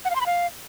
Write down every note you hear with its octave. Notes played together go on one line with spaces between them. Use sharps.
F#5
F5
C6
B5
F5